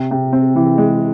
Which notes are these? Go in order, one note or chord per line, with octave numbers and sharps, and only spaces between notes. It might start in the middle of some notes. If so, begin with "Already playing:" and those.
Already playing: C3
C3
C4
E3
G#3